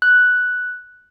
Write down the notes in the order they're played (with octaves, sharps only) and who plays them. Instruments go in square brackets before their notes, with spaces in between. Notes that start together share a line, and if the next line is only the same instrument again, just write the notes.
[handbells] F#6